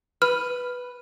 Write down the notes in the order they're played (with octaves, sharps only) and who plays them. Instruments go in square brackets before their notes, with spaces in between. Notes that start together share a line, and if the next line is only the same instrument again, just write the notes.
[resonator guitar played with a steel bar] B4 [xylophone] F6